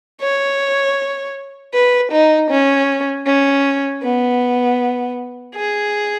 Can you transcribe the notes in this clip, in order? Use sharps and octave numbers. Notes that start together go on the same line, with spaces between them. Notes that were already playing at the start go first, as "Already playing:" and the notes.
C#5
B4
D#4
C#4
C#4
B3
G#4